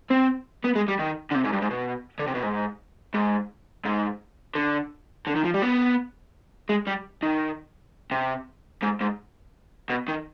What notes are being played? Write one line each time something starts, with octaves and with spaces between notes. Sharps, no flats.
C4
B3
G#3
G3
D#3
D3
C3
G#2
G2
G#2
B2
D3
C3
B2
G#2
G#2
G#2
D3
D3
D#3
F3
G3
B3
G#3
G3
D#3
C3
G#2
G#2
B2
D#3